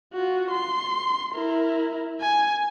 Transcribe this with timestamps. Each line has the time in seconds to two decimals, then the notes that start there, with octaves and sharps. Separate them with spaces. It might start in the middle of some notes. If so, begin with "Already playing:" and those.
0.13 F4 F#4
0.51 C6
1.35 E4 A#4
2.21 G#5